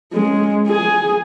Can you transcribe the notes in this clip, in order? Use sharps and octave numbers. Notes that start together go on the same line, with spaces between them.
G#3 C#4
G#4 G#5